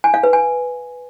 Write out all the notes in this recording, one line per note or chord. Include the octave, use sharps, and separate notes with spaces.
G#5
F5
B4
G#5